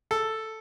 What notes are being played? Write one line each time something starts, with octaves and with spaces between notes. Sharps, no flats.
A4